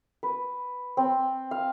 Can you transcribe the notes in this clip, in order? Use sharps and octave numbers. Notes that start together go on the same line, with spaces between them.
B4
C4
F5